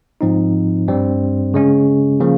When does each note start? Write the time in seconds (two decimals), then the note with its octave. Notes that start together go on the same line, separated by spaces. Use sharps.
0.21 G#2 F3 C4 D#4
0.88 G2 G3 C4
1.54 C#3 G#3 C#4
2.20 C#3 F3 A#3